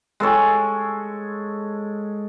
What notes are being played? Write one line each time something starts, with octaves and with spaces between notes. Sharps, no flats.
G#3 A4 C#5